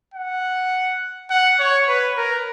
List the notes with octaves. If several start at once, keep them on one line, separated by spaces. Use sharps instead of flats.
F#5
F#5
C#5
B4
A#4